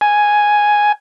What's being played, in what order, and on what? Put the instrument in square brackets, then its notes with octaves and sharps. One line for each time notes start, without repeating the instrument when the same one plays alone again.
[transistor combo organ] G#5